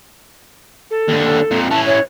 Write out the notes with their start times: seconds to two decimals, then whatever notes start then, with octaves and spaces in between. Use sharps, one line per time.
0.91 A4
1.08 D#2 D3
1.51 F2 A#2
1.71 E3 C#4 A5
1.87 C#5